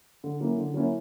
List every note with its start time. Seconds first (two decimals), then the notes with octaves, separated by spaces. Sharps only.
0.24 D3
0.40 F#3 A#3 C#4 E4
0.58 D3
0.74 F#3 A#3 C#4 E4